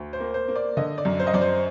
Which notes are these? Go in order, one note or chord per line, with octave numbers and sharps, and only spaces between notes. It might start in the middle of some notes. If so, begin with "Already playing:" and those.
Already playing: D2
C5
A#3
C5
A#3
D5
D3 D#5
D5
F#2
C5
D#5
F#2 D5
C5